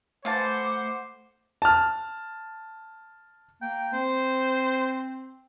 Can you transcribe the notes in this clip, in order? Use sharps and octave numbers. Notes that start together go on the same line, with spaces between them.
E3 A3 C5 F5 F#5 A5 D6
A5 F6
A#3 G5
C4 C5